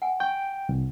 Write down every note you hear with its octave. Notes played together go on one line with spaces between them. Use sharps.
F#5 G#5
G5 C#6
C2